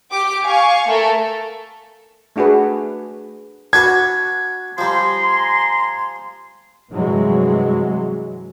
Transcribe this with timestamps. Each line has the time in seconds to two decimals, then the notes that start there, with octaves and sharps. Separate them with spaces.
0.11 G4 D6
0.44 F5 G#5 C#6
0.88 A3 A4 A#4
2.36 A3 D4 F#4 G#4 B4
3.73 D4 F#4 B4 G#6
4.78 F3 G3 G#5 A#5 C6
6.92 G2 C3 E3 F#3 G#3